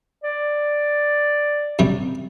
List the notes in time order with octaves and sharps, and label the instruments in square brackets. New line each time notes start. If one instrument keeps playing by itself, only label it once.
[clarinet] D5
[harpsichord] F#2 C3 G3